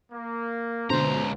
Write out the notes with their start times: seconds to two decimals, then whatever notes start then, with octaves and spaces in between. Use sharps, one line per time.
0.12 A#3
0.90 C#2 B2 D3 C5 A#5